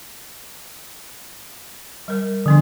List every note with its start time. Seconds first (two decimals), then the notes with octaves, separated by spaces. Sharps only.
2.08 G3 A#4
2.46 D3 F3 B3 D4